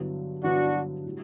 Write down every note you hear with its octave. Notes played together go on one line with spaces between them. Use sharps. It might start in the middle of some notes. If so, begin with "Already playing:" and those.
Already playing: G2 D3 F#3 B3 E4
G2 D3 F#3 B3 D4 E4 F#4
A2 G3 D4 F#4